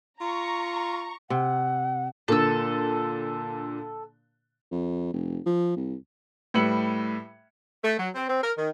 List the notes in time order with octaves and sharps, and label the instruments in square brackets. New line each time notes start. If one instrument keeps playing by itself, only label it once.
[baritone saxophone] F4 [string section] A#5 C#6
[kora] C3 [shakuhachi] F#5
[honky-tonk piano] A#2 D3 [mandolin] A4 E6
[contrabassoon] F2
F1
F3
C2
[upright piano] A2 G3 B4 E6 C#7 F#7
[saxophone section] A3
F#3
C4
C4
A#4
D#3